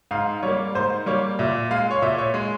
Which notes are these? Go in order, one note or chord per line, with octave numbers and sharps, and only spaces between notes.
G#2 F5
G3 A#3 C#5
G#2 C5
G3 A#3 C#5
A#2 E5
G#3 F5
C#5
A#2 E5
C#5
G#3